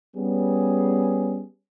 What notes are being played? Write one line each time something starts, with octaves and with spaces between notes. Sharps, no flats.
G3 B3 C#4 G#4